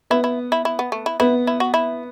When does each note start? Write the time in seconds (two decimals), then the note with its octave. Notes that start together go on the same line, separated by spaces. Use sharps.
0.10 B3 E4
0.24 E4
0.52 E4
0.65 E4
0.79 B3
0.92 A3
1.06 E4
1.20 B3 E4
1.47 E4
1.60 F#4
1.74 E4